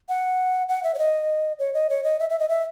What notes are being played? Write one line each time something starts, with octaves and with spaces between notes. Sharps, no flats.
F#5
F#5
E5
C#5
D#5
C#5
D#5
C#5
D#5
E5
E5
D#5
E5